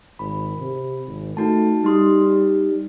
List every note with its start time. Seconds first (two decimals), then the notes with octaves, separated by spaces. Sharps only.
0.19 G#1 B5
0.59 C3
1.07 G#1
1.37 A3 D#4 F#4 A5
1.84 G3 D#4 C6 D#6
2.26 D#4